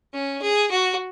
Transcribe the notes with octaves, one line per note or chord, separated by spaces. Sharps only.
C#4
G#4
F#4